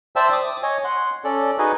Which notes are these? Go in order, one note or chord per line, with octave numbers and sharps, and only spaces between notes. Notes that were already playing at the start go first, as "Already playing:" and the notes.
C5 D5 E5 G5 A5 E6
D6 D#6
C#5 D#5 G#5
F#5 C6
C#4 A4 D5
D#4 F#4 G#4 B4 D#5 G#5